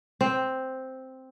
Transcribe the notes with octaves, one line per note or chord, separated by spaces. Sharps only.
C4